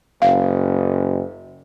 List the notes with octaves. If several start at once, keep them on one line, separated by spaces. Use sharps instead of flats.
F#1 F5